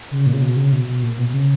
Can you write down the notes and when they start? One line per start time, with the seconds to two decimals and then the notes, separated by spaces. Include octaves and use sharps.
0.11 C#3
0.26 A#2
0.34 C#3
0.42 B2
0.57 C#3
0.72 B2
0.87 B2
1.03 A#2
1.18 B2
1.29 B2
1.34 C#3